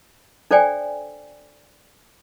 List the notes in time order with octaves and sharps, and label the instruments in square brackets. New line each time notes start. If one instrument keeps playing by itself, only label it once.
[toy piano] D4 A4 C5 D5 G5 G#5